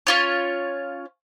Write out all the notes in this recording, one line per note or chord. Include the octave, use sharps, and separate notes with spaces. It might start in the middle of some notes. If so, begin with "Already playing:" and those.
C#4 F4 C#5